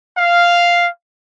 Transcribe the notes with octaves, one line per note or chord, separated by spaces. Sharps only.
F5